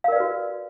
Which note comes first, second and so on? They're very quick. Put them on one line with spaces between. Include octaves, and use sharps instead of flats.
F5 A#4 D5 B4 F#4